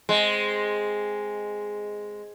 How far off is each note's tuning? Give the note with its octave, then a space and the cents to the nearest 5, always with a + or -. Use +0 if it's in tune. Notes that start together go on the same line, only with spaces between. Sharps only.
G#3 +0 C4 +0